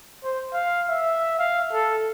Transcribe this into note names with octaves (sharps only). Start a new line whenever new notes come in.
C5
F5
E5
F5
A4